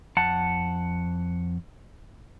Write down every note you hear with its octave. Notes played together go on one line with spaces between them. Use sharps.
F2 F#5 A5